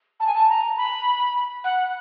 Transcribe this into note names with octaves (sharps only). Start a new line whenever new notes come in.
A5
G#5
A5
A#5
B5
F#5